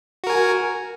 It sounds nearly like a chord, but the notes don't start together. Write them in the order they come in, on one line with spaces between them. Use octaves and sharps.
F#4 A#4 G#5